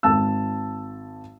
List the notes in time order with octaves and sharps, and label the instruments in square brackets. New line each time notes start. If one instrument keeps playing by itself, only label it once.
[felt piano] G#1 A5 E6